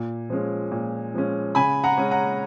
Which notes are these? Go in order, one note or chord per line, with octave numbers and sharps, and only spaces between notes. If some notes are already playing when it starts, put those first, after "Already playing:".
Already playing: A#2
F3 G#3 C#4
A#2
F3 G#3 C#4
C#3 G#5 B5
F#5 A#5
G#3 C#4
F#5 A#5